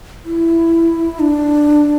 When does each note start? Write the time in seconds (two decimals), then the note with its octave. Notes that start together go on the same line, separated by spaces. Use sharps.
0.25 E4
1.20 D4